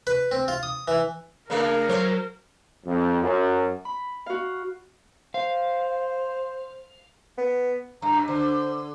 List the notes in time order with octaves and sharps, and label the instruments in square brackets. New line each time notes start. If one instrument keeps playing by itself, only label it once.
[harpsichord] B4
C4
F4
D#6
E3
[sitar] C#3 A3 D4 [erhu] A#4
[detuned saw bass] F#3 [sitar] C5 C#5
[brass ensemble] F2
F#2
[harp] B5
F#4 F5
[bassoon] C5 [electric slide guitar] F5
[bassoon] B3
[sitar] G2 [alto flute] A#5
[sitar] D3 [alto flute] C5